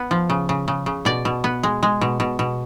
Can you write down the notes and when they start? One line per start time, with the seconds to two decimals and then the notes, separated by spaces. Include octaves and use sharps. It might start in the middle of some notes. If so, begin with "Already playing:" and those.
Already playing: B3
0.11 F3
0.30 C#3
0.49 C#3
0.68 C#3
0.86 C#3
1.05 B2 D5
1.25 B2
1.44 B3
1.63 G#3
1.83 G#3
2.01 B2
2.20 B2
2.39 B2